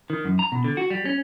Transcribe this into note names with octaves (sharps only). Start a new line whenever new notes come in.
D#3
F#2
A#5
B2
D3
F#4
G3
C#4